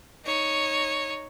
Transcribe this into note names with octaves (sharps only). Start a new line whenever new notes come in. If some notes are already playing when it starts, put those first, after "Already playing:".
D#4 C#5